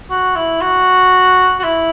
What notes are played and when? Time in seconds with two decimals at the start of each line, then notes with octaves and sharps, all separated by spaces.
0.10 F#4
0.36 E4
0.61 F#4
1.59 F#4
1.64 E4